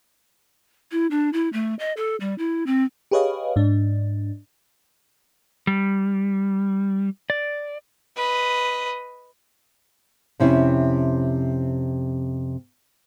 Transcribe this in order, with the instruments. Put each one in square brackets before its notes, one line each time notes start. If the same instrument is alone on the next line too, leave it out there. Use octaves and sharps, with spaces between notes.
[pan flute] E4
D4
E4
A3
D#5
A4
G3
E4
C4
[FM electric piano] G4 G#4 B4 C#5 D#5 F5
G#2 D4
[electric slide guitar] G3
D5
[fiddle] B4 D#5
[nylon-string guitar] F2 C3 C#4 E4